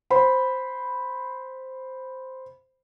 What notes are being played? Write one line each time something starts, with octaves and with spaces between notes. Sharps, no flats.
C5 B5